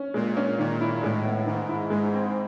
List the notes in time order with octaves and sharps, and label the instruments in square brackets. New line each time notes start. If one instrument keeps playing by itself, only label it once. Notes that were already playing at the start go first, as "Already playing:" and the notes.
Already playing: [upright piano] C#4
[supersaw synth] A#2 [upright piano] G#3
[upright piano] C#4
[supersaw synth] A#2 [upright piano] D#3
[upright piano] E4
[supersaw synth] A2 [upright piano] G#3
[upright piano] B3
[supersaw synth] G#2 [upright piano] D#3
[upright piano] E4
[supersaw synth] G#2 [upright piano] G#3
[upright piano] C4